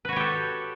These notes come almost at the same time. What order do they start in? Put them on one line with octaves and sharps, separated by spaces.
B4 F#4 C#5 G4 A4